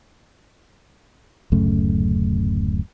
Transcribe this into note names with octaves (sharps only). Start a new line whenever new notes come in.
D1 F#2 C#3 A3